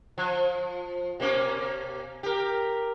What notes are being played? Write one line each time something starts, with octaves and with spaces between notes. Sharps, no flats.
F3
B2 A#3 C#4
G4 A#4